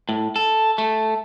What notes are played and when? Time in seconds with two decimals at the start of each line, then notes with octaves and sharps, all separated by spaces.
0.09 A2
0.36 A4
0.78 A3